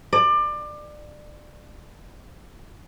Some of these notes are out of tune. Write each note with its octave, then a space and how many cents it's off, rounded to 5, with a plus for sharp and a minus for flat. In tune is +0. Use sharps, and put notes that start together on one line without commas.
D5 +25